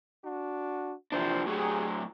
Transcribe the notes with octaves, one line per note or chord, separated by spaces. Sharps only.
D4 F#4
C3 E3 F3 D4 C5
A2 F#3 G4 G#4